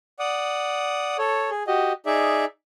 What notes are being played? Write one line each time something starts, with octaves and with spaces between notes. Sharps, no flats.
D5 F#5 D#6
A4 C#5
G#4
F#4 G4 D#5
D#4 G#4 D5 E5